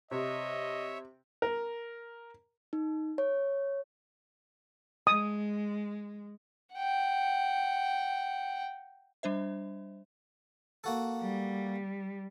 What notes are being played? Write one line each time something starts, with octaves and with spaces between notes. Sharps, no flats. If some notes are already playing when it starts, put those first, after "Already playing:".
C3 C#5 D#5 E5
A#4
D#4
C#5
G#3 D#6
F#5 G5
G3 D4 C5 E5
A#3 F#4 A4
G3